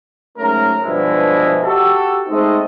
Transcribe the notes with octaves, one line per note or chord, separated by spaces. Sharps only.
G#2 F#3 A3 C#4 A#4
G2 B2 F3 G3 G#3 E4
F#4 G4 A4
G#3 A3 C4 D#4 A4 D#5